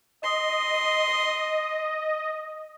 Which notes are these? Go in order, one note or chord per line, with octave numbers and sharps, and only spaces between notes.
D#5 C6